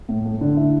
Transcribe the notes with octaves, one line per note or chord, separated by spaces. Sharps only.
A2
A3
D3
E4